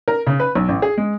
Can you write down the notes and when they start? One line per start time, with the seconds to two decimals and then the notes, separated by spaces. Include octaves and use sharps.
0.08 A#4
0.27 C#3
0.40 B4
0.55 B1
0.69 A1
0.82 G#4
0.98 G#3